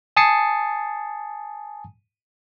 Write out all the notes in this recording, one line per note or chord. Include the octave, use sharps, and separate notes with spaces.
G#5 A5 D#6 A6 C7 C#7